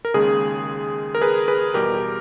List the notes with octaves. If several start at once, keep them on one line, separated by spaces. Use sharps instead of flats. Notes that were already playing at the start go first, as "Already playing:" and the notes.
A#4
D#2 C#3 G#3 G#4
A#4
G#4 B4
G#4 B4
E2 B2 G3 G4 A#4
G4